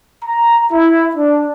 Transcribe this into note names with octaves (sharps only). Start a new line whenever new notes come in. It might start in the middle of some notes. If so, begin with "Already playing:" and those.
A#5
E4
D4